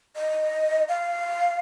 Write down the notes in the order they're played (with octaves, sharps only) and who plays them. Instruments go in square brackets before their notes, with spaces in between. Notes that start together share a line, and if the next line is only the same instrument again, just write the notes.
[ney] D#5
F5